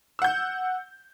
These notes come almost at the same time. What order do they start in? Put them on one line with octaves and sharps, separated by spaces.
E6 F#5 G6